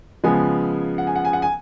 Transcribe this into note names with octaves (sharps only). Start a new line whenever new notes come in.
C#3 F3 G#3 B3 G#5
F#5
G#5
F#5
G#5
F#5
G#5